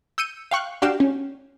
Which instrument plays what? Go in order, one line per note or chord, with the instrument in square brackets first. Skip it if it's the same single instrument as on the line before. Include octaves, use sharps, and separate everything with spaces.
[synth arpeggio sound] E6 G6 C#7 D#7
F5 G5 C#6 F#6
D4 F#4 G4 F5 G5 E7
C#4